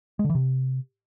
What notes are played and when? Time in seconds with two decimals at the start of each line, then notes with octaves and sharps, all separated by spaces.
0.19 G#3
0.24 D3
0.30 E3
0.35 C3